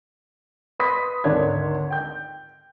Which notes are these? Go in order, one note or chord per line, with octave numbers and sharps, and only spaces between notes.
B4 B5 C6 D#6 B6
G#1 D2 D4 C#5 G#6
G5 G6